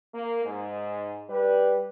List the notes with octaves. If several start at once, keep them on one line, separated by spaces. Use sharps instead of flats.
A#3
G#2
G3 B4